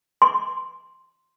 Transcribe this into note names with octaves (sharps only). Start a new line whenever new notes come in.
C6